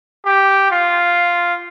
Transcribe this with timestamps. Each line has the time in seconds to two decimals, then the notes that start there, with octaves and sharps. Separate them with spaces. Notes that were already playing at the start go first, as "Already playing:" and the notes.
0.25 G4
0.71 F4